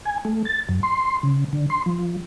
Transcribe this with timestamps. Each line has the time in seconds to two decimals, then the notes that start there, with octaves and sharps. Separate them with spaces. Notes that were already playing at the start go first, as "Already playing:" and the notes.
0.05 G#5
0.25 A3
0.45 A6
0.69 F#2
0.83 C6
1.23 C#3
1.53 D3
1.70 C6
1.86 F3